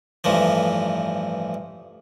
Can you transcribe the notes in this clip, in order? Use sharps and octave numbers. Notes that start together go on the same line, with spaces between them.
A1 G2 E3 F3